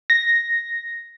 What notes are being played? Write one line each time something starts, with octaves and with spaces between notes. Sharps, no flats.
A#6